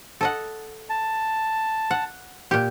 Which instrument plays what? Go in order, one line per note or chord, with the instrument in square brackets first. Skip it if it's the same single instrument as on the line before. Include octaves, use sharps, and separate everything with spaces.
[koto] A4 D#5 F#5
[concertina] A5
[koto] F#5
A#2 G4